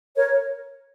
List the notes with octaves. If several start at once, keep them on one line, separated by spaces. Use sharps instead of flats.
A#4 C#5